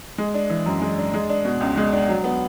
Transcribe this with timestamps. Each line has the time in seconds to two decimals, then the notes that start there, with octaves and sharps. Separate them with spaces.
0.18 G#3
0.34 D4
0.50 E3
0.66 F#2
0.82 G#3
0.98 D4
1.14 G#3
1.29 D4
1.45 B2
1.61 C#2
1.77 G#3
1.93 D4
2.09 F#3
2.24 B3